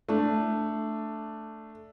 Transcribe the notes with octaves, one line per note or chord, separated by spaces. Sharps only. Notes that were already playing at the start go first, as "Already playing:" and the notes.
A3 D4